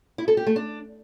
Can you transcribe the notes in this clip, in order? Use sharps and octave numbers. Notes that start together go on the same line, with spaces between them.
E4
A4
G4
A3
D4